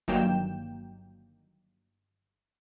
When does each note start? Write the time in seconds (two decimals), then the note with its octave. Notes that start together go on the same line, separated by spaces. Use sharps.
0.08 G1 D#3 F#3 A#3 G5 E7